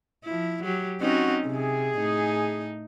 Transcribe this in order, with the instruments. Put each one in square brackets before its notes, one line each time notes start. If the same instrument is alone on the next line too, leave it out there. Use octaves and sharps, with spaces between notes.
[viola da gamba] F3 E4
F#3 G4
[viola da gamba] C4 C#4 D#4 [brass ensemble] F#4
[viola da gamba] C3 [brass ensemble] G#4
[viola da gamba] A2 D#4